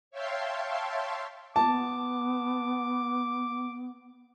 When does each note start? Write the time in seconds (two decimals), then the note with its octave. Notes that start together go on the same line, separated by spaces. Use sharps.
0.11 C#5 E5 F5 G5 A5 C6
1.56 B3 A5 D6